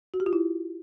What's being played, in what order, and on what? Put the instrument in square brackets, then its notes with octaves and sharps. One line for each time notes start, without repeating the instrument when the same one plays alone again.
[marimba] F#4
G4
F4
E4